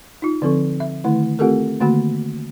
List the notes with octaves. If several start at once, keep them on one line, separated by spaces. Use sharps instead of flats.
D#4 F4
D3 F3 C4 A4 C#6
E5
D3 D#3 A3 E4
A3 C4 F4 G4 A4 A#4
D3 D#3 A3 A#3 F#4 B5